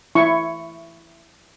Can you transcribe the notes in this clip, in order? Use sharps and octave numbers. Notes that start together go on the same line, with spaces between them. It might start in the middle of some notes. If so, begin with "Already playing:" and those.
E4 C#6